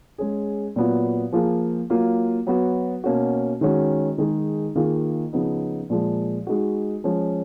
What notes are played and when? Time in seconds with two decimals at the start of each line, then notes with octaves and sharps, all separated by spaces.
0.18 G#3 C#4 G#4
0.76 A#2 F#3 B3 F4
1.33 F3 A#3 F4 G#4
1.90 F#3 A#3 F4
2.47 F#3 B3 F#4
3.04 B2 A#3 C#4 F#4
3.61 D#3 G#3 C#4 F#4
4.18 D#3 G#3 D#4 G#4
4.75 D#3 A#3 F4 G#4
5.33 C#3 F3 B3 D#4
5.90 A#2 F3 G#3
6.47 G#3 D#4 F#4
7.04 F3 G#3 C#4